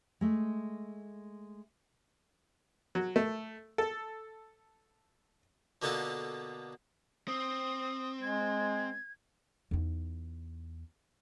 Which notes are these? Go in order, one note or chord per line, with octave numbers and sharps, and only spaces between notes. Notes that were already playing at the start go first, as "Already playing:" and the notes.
G#3 A3
F#3
A3
A4
B2 D3 A#3 B3 F4 A4
C4 D#6
G#3 G#6
E2 D#4